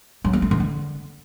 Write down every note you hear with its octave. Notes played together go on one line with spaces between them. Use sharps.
F#3
A#3
A3
D#3
D3